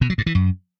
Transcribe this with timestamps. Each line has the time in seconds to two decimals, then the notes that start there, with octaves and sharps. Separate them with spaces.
0.01 B2
0.10 F#3
0.18 G2
0.26 E3
0.35 F#2